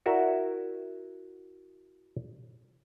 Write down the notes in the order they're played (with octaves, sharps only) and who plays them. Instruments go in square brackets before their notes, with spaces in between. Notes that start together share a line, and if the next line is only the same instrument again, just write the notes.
[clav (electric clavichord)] E4 F#4 A#4 D5 E5